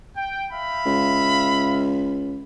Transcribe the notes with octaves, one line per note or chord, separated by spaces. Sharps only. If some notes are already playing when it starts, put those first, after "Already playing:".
G5
E5 F5 B5
C#2